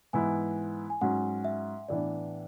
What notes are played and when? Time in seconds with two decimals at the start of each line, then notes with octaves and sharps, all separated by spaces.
0.13 G#2 E3 B3 E4 G#5
0.90 G#5
1.01 G#2 F#3 C#4 F#5
1.45 E5
1.89 A2 E3 B3 D4 D5